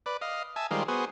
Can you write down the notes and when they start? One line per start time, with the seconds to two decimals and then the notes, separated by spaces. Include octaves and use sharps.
0.06 B4 D5
0.21 D#5 F5
0.56 E5 G#5 A5
0.71 D#3 G3 G#3 F4 C5
0.88 B3 F#4 G#4 C5